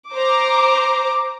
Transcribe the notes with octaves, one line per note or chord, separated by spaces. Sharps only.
C5 A#5 D6